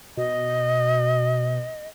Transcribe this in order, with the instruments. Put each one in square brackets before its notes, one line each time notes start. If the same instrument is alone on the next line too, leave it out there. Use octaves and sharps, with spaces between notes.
[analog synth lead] B2 [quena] D#5